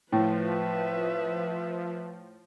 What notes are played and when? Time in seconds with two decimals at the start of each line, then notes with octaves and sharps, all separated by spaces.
0.12 A2 F3 B4 E5